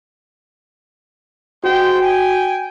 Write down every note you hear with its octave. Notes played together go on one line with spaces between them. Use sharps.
G#3 F#4 C5 G5
G5 G#5